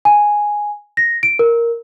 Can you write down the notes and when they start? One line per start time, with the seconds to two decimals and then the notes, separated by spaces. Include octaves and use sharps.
0.05 G#5
0.97 A#6
1.23 D7
1.39 A#4